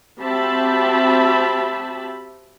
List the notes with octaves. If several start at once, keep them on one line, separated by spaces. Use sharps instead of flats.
C4 F#4 G4 E5 A5 B5